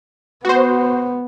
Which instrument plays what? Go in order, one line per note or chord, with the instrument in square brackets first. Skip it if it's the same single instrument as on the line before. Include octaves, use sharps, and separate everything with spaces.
[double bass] B3 [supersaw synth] F#4 C5